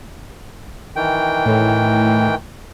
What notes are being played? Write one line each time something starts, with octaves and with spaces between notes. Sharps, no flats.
D#3 E3 G5
A2